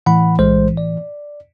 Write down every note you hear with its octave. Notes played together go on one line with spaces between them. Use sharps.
A2 E3 F#5 B5
B1 G#3 C5
D5